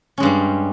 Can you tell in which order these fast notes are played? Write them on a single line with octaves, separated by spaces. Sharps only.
C#4 G#3 G2 G3